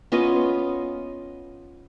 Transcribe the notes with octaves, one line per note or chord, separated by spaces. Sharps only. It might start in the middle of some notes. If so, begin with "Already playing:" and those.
B3 C#4 F4 D#5